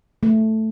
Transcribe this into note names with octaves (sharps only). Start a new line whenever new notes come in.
A3